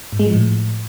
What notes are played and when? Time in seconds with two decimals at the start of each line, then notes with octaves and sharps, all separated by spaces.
0.13 G#2
0.20 G#3
0.27 F3
0.34 A2